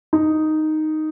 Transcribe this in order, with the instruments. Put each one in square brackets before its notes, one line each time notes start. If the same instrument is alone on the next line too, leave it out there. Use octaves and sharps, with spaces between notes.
[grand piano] D#4